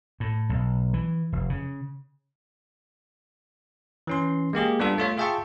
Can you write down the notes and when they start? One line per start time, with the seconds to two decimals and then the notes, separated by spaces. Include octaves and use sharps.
0.20 A2
0.49 B1
0.94 E3
1.32 F1
1.50 C#3
4.07 E3 C#4 C6
4.53 G#3 A#3 G4 G#4
4.79 G3 B3 D4 F4 A4
4.98 A3 F4 C#5
5.18 F4 G#4 E5 G5 A5 C#6